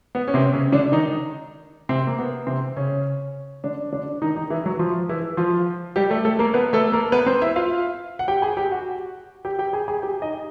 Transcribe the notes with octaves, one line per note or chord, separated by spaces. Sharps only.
B3
C#4
C3 C4
C#3 C#4
D3 D4
D#3 D#4
C3 C4
A#3
B3
C3 C4
C#3 C#4
D3 D4
D3 D4
D#3 D#4
D#3 D#4
E3 E4
F#3 F#4
F3 F4
E3 E4
F3 F4
G3 G4
A3 A4
A3 A4
A#3 A#4
B3 B4
A3 A4
A#3 A#4
B3 B4
C4 C5
E4 E5
F4 F5
F#5
G4 G5
G#4 G#5
G4 G5
F#4 F#5
G4 G5
G4 G5
G#4 G#5
G#4 G#5
G4 G5
D#4 D#5